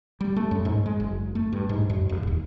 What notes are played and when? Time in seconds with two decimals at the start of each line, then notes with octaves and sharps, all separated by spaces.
0.21 G3
0.36 A3
0.51 F#2
0.65 G#2
0.86 G#3
1.00 F#1
1.35 A3
1.53 G2
1.69 G#2
1.90 F#2
2.09 D1
2.27 D#2